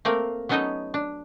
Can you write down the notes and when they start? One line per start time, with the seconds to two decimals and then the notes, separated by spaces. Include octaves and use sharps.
0.05 A3 A#3 C4 A#4
0.49 F#3 B3 C#4 D#4 A4 D#5
0.94 D4